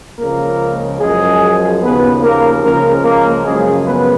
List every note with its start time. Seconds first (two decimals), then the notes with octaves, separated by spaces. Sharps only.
0.19 C#2 C#3 F3 A#3 A#4
1.01 F#2 F3 G#3 G#4
1.82 D#2 C#3 F3 B3 B4
2.23 A#3 A#4
2.64 C#2 C#3 F3 A#3 A#4
3.05 A#3 A#4
3.45 F#2 C#3 F3 G#3 G#4
3.86 B3 B4